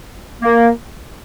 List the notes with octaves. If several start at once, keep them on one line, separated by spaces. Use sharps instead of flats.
A#3